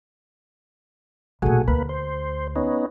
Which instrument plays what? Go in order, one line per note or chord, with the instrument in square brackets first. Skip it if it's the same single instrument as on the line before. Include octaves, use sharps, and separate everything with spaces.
[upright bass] B1 A#2 [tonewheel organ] A3 F#4 G#4
[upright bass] D2 [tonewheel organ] A#3 B4
[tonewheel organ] C5
B3 C#4 D#4